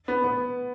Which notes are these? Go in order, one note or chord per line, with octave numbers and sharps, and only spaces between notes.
B3
B3